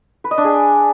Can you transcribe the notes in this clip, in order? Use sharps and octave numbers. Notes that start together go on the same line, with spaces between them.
B4
D#5
D4
G#4